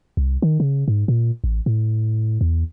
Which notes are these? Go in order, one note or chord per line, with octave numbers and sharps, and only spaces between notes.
C2
D#3
C#3
G#2
A#2
A1
A2
E2